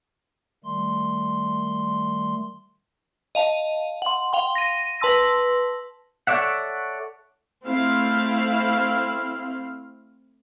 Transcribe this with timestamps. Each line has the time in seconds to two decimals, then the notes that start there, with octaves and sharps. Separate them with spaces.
0.64 D#3 G3 A3 C6
3.35 D#5 F5 A5
4.02 F#5 C6
4.33 F5 G5 C6
4.55 A#6 D#7
5.01 B4 A5 C6 E6 A#6
6.27 A4 C#5 D5 E5 F#5
7.66 A3 C4 E4 F5